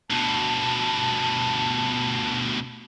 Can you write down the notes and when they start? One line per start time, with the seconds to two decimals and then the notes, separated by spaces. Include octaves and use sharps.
0.10 D2 B2 A5